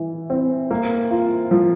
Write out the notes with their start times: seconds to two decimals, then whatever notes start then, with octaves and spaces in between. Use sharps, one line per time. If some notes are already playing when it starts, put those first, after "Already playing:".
Already playing: E3
0.30 C4
0.71 A#3
1.11 F4
1.51 F3